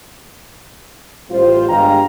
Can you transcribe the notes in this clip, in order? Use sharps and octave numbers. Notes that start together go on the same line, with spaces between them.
A1 G3 F4 C5
G1 G2 G#3 F5 G5 A#5